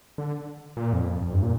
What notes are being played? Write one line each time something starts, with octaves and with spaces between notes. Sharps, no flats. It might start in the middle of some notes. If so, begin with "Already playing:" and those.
D3
A#2
F2
F2
G2
A#2